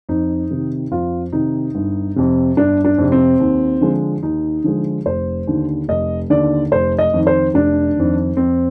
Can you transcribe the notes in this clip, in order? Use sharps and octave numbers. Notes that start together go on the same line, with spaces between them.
F2 D#4
C3 D#3
F2 F4
C3 D#3 D#4
G1
F2 C3
G1 D4
D4
F2 C3
C4
D#2
D3 F3 G#3
D#2 D#4
D3 F3 G#3
F1 C5
D#2 D3
F1 D#5
D#2 D3 D5
F1 C5
D#5
F2 D#3
C5
F1 D4
F2 D#3
F2 C4